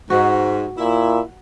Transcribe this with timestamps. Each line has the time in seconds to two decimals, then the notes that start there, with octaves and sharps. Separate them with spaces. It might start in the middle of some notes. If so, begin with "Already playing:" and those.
0.10 G#2 F#4
0.78 A#2 E4